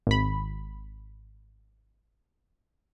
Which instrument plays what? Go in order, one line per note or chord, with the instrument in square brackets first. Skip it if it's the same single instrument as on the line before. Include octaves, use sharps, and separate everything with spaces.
[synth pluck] G#1 B5